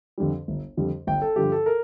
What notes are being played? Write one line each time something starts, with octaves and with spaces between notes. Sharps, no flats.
F2 D3 G3
G1
F2 D3 G3
G1 G5
A4
G2 D3 F3 G4
A4
A#4